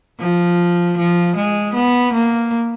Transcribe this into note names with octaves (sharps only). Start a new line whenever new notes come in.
F3
F3
G#3
B3
A#3